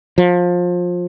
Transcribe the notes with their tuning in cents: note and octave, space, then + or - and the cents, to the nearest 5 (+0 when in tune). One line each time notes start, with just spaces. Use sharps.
F3 +25